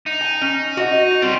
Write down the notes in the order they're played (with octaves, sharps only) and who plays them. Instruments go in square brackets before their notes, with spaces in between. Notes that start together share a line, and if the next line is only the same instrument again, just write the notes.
[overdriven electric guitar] D#4
[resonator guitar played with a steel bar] G#5
C#4
F#4 D#5
[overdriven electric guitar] G3 C#4 [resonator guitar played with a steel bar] C4 F4